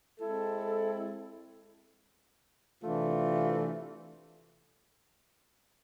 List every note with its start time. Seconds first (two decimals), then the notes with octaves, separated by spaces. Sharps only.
0.19 G#3 C4 E4 A4
2.82 C3 E3 A3 D4 F4